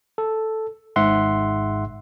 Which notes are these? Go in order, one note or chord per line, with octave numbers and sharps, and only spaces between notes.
A4
G#1 G#2 E5 F#5 C6